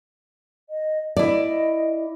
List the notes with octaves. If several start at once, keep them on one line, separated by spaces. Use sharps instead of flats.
D#5
E4 D5 D#5